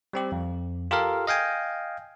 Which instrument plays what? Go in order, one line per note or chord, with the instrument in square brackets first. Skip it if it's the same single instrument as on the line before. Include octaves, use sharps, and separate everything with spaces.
[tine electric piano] G3 C4 G4
F2
F4 G4 A4 A#4 F5
D#5 F5 G5 G#5